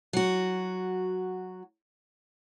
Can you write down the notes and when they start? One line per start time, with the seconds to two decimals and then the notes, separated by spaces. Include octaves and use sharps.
0.13 F#3 F#4